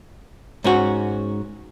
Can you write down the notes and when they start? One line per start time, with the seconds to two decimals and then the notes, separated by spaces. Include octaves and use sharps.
0.64 G#2 C#4 F#4